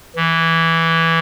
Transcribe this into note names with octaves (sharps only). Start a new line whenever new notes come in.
E3